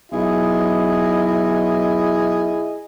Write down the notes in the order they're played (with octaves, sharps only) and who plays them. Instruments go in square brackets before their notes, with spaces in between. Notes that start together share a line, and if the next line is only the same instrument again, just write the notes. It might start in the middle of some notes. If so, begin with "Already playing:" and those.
[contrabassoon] B1 [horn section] E4 G#4 D#5